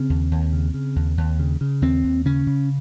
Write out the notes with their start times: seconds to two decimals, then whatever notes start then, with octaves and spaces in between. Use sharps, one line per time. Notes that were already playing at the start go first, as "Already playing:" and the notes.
Already playing: C#3 C4
0.10 D#2
0.31 D#2
0.52 C#3
0.74 C#3
0.96 D#2
1.17 D#2
1.39 C#3
1.61 C#3
1.82 D#2 C4
2.04 D#2
2.25 C#3 C#4
2.47 C#3